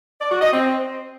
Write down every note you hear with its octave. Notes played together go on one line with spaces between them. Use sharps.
D5
F#4
D#5
C4